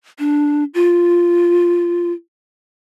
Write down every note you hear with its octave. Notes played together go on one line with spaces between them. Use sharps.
D4
F4